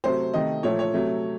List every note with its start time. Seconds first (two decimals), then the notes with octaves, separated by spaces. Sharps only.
0.04 C3 F#3 A3 C5
0.34 C3 D#3 A3 D#5
0.63 A#2 F3 A3 C#5
0.79 C#5
0.94 C3 F#3 A3